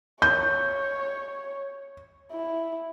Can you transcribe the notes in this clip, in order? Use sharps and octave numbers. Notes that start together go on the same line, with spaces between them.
C#5 G6
E4